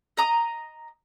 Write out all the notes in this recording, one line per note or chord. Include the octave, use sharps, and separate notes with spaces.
D#5 A#5 D#6